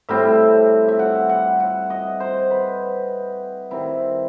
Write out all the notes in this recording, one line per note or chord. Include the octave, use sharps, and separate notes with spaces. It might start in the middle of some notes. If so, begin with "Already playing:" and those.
A2 G3 C4 E4 E5
E5
F#5
F#5
F#5
D#5
C5
B4
D#3 G3 C4 E4